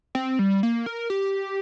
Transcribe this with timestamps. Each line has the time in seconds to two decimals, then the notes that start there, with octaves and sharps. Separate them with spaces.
0.15 C4
0.39 G3
0.63 A#3
0.86 A#4
1.10 G4